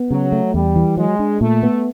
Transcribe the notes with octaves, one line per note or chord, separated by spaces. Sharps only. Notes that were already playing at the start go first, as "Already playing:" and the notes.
Already playing: B3
C#3 F#3
A3
E2 G3
E3
F#3 G#3
D4
A#2 A3
B3